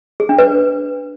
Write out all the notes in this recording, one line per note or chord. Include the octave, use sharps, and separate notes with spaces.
G#4
D4
B4